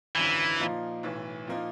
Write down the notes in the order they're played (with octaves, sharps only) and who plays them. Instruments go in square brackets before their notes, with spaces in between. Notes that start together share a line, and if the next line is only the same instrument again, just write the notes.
[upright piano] G#1 F#2 D3 [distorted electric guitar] E3
[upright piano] A#2 F3 A#3 D#4
B1 A2 E3
A#2 F3 A#3 D#4